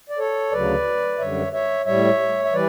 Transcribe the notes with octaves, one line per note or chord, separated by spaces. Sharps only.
D5
A4 C#5
D2 C#3 F#3 B4 D5
F#2 D3 G3 C#5 E5
C#5 E5
A2 G3 C#5 E5
E5
E3 G3 B4 D5